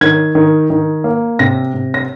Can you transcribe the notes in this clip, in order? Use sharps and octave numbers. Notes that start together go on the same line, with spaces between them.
D#3 G#6
D#3
D#3
A#3
C3 A#6
C3
A#6